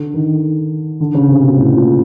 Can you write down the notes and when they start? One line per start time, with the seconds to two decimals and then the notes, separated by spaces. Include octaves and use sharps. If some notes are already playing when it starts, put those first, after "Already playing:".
Already playing: D3
0.14 D#3
1.00 D3
1.15 C#3
1.28 C3
1.42 B2
1.57 A2
1.75 A#2